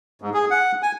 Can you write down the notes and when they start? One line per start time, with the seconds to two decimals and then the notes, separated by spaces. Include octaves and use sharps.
0.22 G#2
0.34 G#4
0.51 F#5
0.83 G#5